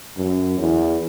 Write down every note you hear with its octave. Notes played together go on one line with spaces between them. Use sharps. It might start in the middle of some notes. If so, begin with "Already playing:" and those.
F#2
E2